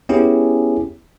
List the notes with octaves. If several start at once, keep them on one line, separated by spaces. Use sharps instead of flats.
B3 C#4 E4 G4 G#4